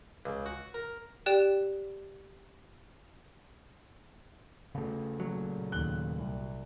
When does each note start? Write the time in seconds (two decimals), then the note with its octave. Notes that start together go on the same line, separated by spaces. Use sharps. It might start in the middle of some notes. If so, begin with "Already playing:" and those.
0.26 C#2
0.46 F#4
0.74 A#4
1.26 G4 D5 G5 F#6 E7
4.75 C#3 A3
5.20 A#2 F#3
5.72 D#2 F#6 G7
6.19 C2